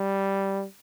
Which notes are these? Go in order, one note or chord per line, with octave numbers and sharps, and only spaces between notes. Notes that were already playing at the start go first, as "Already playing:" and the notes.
Already playing: G3